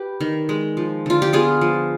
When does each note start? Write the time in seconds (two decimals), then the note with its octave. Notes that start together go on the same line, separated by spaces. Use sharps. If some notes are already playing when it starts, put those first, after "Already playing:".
Already playing: G4 B4
0.21 D#3
0.49 G#3
0.77 F3
1.06 D3 F4
1.22 G4
1.33 B3 F4 G#4
1.61 F3